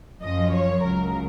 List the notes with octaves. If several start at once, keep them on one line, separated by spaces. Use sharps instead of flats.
F#2 F3 D#5
C#5
C#2 C#3 F#3 A#4